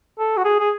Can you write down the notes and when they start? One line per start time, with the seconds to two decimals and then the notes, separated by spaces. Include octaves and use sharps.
0.19 A4
0.37 F#4
0.45 G#4
0.60 G#4